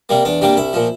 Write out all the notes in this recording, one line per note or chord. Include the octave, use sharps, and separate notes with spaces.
C3 G3 A#3
E2 D4
C3 G3 A#3 D4
C2 E4
A#2 F3